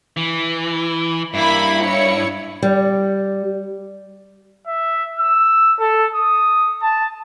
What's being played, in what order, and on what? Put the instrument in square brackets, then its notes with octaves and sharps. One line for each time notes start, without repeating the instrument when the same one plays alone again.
[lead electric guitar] E3
[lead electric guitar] G2 [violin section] A#3 E4 B5
[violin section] E4 C#5 C#7
[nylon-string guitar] G3
[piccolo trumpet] E5
E6
A4
D#6
A5